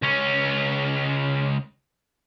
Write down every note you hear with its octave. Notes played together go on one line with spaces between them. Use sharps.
C#2 C#4